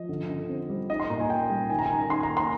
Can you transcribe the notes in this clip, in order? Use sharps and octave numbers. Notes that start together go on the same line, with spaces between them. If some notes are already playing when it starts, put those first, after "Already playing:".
Already playing: F3 D#5
D3
D3
C4
G3
D#4 D#5
C6
A#2 A#5
G#5
A#3 G5
G3
D#3 G#5
A#5
D#3 G#5
D#4 C6
A#5
A#3
C6